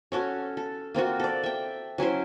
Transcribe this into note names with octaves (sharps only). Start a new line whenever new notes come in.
C#4 F#4 A4 C#5
A4
A#3 C4 F4 F#4
A4 D5
E5 G5
F#3 C#4 E4 C5